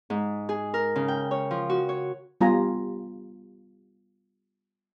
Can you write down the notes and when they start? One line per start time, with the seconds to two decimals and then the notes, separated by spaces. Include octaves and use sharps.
0.10 G#2
0.49 G#4
0.74 A#4
0.96 C#3
1.08 G5
1.31 C#5
1.51 F3
1.69 F#4
1.89 C#5
2.41 G3 B3 F4 G4 G#5 A#5